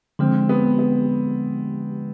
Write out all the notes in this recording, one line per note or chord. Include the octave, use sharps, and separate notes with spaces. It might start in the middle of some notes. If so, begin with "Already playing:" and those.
D3 F3 G#3 C4
B3
B3